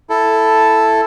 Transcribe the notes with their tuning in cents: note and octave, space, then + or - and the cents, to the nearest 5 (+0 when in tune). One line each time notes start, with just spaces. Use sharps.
E4 +0 A4 +0